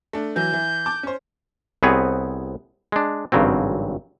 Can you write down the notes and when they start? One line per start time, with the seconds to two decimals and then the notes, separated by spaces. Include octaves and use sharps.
0.13 A3 D4
0.36 E3 F#3 G6
0.53 E3
0.86 A5 D6
1.03 C#4 C5
1.83 C2 B3 C4 G#4 B4 C#5
2.92 G#3 D4
3.32 G#1 G2 C#3 F#3 C4